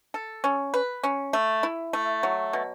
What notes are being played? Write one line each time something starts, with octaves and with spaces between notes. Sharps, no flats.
A4
C#4
B4
C#4
A3
E4
A3
F#3
B2